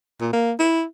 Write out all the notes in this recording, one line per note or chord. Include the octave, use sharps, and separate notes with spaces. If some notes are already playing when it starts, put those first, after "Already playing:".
A#2
A#3
E4